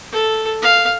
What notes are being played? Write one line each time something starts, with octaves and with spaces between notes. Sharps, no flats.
A4
F5